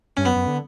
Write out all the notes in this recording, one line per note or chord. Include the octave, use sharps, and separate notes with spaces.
G2 C#4
F#2 B3
F#2
D3